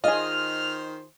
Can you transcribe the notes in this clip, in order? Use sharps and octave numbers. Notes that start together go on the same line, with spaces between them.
D#3 F4 G#4 C5 D#5 F6